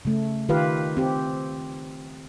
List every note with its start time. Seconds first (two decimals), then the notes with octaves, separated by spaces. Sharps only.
0.05 C#3 A3
0.49 D#3 F4 G4 B4 F5
0.97 C4 G4